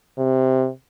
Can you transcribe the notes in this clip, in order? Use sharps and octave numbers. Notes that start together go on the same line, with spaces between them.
C3